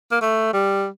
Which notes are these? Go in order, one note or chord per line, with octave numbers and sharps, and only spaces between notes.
A#3
A3
G3